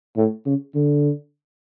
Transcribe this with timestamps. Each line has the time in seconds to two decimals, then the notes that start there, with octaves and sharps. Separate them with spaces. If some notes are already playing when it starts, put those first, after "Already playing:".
0.17 A2
0.45 C#3
0.74 D3